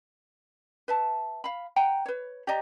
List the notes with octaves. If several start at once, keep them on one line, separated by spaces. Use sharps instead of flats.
B4 E5 A5
F5 B5
F#5 G5 A#5
B4 C#5
G4 D5 D#5 A#5